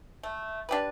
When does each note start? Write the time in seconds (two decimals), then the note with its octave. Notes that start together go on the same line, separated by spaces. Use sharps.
0.23 A3
0.69 D4 G4 B4